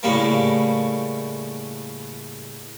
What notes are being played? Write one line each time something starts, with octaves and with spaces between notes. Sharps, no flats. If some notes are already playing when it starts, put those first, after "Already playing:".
A2 C#3 G3 A#3